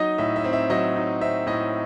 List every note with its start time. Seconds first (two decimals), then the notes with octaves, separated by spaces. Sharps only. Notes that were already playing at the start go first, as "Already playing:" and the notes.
Already playing: F#3 D#4 D#5
0.18 A2 E5
0.36 E5
0.44 C4
0.53 E5
0.70 F#3 D#5
0.96 D#4
1.21 C4 E5
1.47 A2 D#5